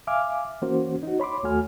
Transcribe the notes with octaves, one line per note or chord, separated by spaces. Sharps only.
E5 F5 G#5 D6 F6
E3 A#3 C#4 F#4 C5
D#4 F#4
C#5 B5 C6 D6
D#2 A3 F#4 G#5 F6